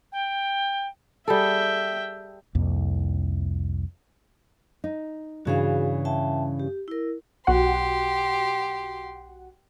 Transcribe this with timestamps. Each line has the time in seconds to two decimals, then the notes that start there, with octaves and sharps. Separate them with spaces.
0.12 G5
1.28 G3 G#4 A4 E5 G5
2.55 C2 F2 A#3
4.84 D#4
5.45 G2 C#3 E3 F#4 G#4 F5
6.05 E5 G5 A5
6.60 G4
6.88 E4 A#4
7.47 B1 F#4 G4 F#5 C6